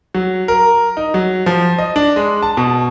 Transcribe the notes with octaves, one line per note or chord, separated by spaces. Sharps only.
F#3
A#4
D#4
F#3
F3
D#5
D4
G#3
A5
B2